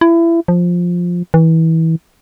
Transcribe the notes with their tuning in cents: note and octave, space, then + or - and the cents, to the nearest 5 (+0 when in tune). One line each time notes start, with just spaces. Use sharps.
E4 +25
F3 +10
E3 -25